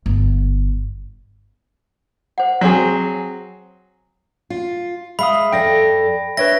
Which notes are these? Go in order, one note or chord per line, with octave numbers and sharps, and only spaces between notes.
G1
C5 F#5
F#3 C4 G#4 C#5
F4
G#3 E5 F5 B5 D#6
F2 A4 D5 G5 A#6
D4 B4 C#5 E5 A#6